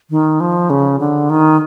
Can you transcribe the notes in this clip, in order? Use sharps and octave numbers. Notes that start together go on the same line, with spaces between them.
D#3
F3
C#3
D3
D#3